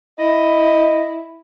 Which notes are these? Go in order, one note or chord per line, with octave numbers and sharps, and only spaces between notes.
E4 D#5